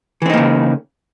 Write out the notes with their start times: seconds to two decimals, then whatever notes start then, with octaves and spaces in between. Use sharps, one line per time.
0.22 E3
0.26 C4
0.30 D#4
0.33 A#3
0.37 C#3